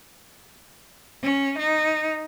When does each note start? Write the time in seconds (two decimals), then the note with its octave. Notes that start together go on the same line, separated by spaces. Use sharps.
1.23 C#4
1.58 D#4